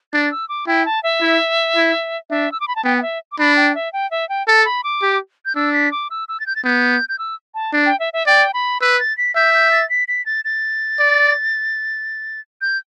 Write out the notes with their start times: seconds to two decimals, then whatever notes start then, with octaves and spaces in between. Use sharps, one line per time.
0.13 D4 A6
0.31 E6
0.49 D6
0.67 E4 G5
0.86 A5
1.03 E5
1.21 E4
1.76 E4
2.30 D4 E5
2.52 E6
2.60 D6
2.68 B5
2.76 A5
2.84 B3 G5
2.98 G5
3.02 E5
3.32 D6
3.39 D4 B5
3.56 G5
3.75 E5
3.93 G5
4.11 E5
4.29 G5
4.47 A4 A5
4.65 B5
4.84 D6
5.02 G4
5.46 G6
5.55 D4 E6
5.73 B6
5.92 D6
6.11 E6
6.28 E6
6.40 A6
6.47 G6
6.56 A6
6.64 B3 G6
7.09 G6
7.19 E6
7.54 A5
7.73 D4
7.86 G5
8.00 E5
8.13 E5
8.27 D5 G5
8.54 B5
8.81 B4 E6
8.99 A6
9.18 B6
9.35 E5 G6
9.54 G6
9.72 A6
9.90 B6
10.08 B6
10.26 A6
10.45 A6
10.99 D5
12.61 G6